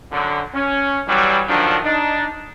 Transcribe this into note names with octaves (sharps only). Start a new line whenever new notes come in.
F#2 D3
C#4
E3 F#3 G3
D3 D#3 F3 F#3 D4
D4 D#4